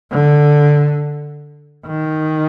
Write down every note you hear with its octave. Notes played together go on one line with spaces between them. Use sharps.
D3
D#3